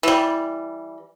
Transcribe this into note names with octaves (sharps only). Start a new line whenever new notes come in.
E3 G3